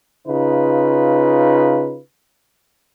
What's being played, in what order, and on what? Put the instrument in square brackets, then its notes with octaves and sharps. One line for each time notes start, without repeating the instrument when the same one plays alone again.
[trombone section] C#3 D#4 F4 B4